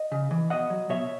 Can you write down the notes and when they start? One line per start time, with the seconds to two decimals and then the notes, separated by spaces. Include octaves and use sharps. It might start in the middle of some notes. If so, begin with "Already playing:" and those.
Already playing: D#5
0.12 C#3
0.31 E3
0.50 B2 D#5 F#5
0.70 F#3
0.89 B2 C#5 E5